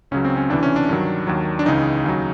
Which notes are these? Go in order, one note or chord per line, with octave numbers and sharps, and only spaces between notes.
C#2 C#3 F#3 C#4
C4
C#4
D2 C3 E3 D4
C#4
D4
G2 D#3 F#3
D#2 D#3 F#3
D4
C#2 C#3 E3 D#4
D#2 C#3 F#3